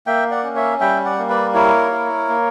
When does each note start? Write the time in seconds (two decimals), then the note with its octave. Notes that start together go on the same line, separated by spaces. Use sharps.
0.07 A#3 E5 G5
0.31 D5 F#5
0.44 C#4
0.56 C#5 E5
0.80 G3 E5 G5
1.05 D5 F#5
1.18 A#3
1.30 B4 D5
1.54 E4 A#4 C#5
1.91 E4
2.29 A#3